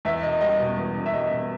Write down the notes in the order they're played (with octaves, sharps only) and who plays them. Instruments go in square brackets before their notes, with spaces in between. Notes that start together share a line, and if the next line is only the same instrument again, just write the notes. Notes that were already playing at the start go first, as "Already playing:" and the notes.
[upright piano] E2 E5
E1 D#5
G3 D#5
B2
E2
E1
E5
G3 D#5
B2